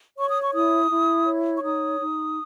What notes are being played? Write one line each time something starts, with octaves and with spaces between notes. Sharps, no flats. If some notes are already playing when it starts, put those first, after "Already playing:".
C#5 C#6
D#6
C#6
E4 D#6
E4
C#5
C#6
D#4 D#6
D#4